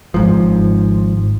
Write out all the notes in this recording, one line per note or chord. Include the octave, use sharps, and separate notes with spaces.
G#1 G#2 F3